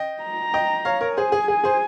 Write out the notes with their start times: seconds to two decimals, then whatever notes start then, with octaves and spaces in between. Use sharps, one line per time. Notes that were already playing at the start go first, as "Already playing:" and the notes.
Already playing: D#5 G5
0.22 A#5
0.54 D#5 G5
0.85 C#5 F5
1.01 A#4 C#5
1.16 G#4 C5 G#5
1.32 G#4
1.48 G#4
1.64 G#4 C5